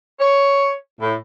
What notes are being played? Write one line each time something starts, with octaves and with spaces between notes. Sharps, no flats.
C#5
A2